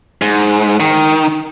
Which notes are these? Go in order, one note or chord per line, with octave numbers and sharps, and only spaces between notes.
G#2
D#3